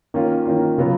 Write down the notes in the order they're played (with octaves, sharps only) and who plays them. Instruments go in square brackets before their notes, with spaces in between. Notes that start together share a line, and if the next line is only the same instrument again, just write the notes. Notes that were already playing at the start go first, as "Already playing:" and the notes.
[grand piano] D#3 A#3 C#4 F4
D#3 A#3 C#4 F4
C#3 F#3 B3 F4